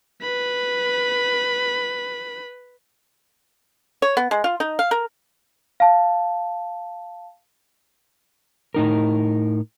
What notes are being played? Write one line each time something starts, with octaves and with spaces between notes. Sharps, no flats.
B4 B5
C#5
B3
G#3
F4
D#4
F5
A#4
F5 A5
A2 D#4 A#4